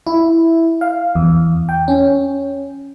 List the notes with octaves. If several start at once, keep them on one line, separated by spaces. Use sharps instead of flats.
E4
F5
E2
G5
C#4